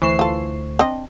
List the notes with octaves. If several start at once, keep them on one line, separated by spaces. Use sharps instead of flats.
D2 E3 A3 C5 C#6 C7 E7
F4 A4
C4 D4 D#5